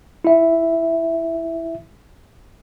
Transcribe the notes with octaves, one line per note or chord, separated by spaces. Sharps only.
E4 E5